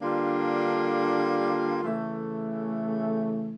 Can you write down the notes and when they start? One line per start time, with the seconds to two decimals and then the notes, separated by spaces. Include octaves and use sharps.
0.02 D3 G3 A#3 D4 F4
1.84 C#3 E3 A3